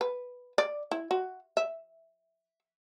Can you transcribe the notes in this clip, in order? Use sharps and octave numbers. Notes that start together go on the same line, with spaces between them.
B4
D5
E4
F#4
E5